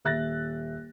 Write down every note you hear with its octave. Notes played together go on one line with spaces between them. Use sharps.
D#1 E5 F#6 A6 A#6